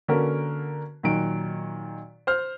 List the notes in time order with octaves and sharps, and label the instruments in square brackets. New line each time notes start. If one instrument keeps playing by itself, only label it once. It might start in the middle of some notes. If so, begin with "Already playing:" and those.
[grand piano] D3 A#3 C#4 F#4 A#4 B4
A#2 D#3 F#3 D7
C5 F6